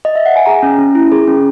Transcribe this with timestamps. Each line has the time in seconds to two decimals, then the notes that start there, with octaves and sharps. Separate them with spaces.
0.05 D#5
0.15 E5
0.26 F#5
0.36 G#5
0.46 G#4 A#5
0.63 C#4
0.79 C#4
0.95 E4
1.12 G#4
1.27 C#4